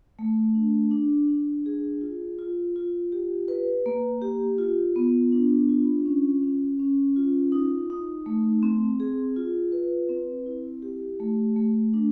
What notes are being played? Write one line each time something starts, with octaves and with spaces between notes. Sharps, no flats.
A3
D4
D4
D4
G#4
F4
F4
F4
G4
B4
A#3
G4
F4
B3
D4
F4
C#4
C#4
C#4
F4
D#4
D#4
A3
C4
G#4
F4
B4
C4
E4
G4
A3
A3
D4